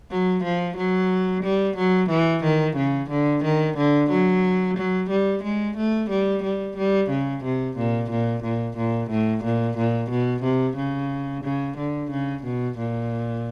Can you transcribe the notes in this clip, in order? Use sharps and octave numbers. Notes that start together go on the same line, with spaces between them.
F#3
F3
F#3
G3
F#3
E3
D#3
C#3
D3
D#3
D3
F#3
F#3
G3
G#3
A3
G3
G3
G3
C#3
C3
A#2
A#2
A#2
A#2
A2
A#2
A#2
B2
C3
C#3
C#3
D3
C#3
B2
A#2